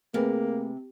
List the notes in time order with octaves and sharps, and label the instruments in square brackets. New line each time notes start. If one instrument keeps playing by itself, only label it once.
[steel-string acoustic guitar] C3 [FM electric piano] A3 G#4 B4 [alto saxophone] A#3